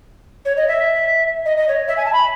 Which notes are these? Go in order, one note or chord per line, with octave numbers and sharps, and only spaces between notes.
C#5
D#5
E5
D#5
D#5
C#5
E5
G#5
A5
B5